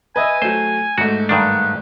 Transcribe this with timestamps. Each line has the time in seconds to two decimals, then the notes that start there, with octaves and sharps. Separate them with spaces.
0.16 B4 D#5 E5 G#5
0.42 F#3 A3 C5
0.98 G#2 A3 F#4
1.29 G2 D#3 D4 F#5